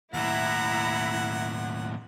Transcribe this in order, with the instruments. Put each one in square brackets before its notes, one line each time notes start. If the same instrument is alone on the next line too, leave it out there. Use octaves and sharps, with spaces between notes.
[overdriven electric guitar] D#2 A2 [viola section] E4 [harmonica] F#5 [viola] A#5